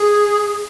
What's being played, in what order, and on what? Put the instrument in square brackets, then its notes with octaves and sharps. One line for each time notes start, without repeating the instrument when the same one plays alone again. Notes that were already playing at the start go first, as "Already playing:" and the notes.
Already playing: [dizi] G#4